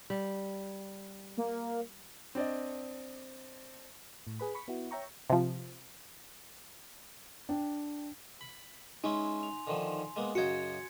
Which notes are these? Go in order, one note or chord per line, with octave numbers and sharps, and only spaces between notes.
G3
A#3
C4 D4 D5 D#5
A2
G#4 B4 B5
B5 C#6 B6
B3 E4 F#4
C#5 E5 G5 A#5 C#6
C3 F3
D4 G5
B5
G#3 C#4 D#4 E4 G#5 C6
F7
D3 D#3 F3
G#3 A#3 B3
F#2 C#3 D#4 F#4 G#6 C#7